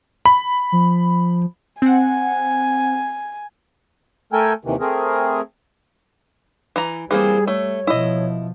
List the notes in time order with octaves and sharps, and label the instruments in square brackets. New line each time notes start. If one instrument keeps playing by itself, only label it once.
[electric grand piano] B5
[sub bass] F3
[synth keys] C4 F#5 [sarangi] G#5
[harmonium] A3 A4 A#4 G5 G#5
D#2 C3 D#3 E3
A3 C4 G#4 A#4
[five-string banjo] E3 A#5
[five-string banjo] E3 A#3 C4 [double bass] G3 [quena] G#4
[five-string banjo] A3 [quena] C#5
[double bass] B2 F3 [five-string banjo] E4 D#5